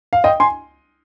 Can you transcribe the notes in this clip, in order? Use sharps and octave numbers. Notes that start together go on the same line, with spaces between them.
F5
D#5 G5
G#5 C6